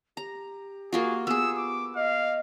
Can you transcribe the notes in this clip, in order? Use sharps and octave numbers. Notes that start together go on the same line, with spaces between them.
G4 A#5
A#3 F4 F#4 G#4
B3 G#4 E6
D6
D#5 F5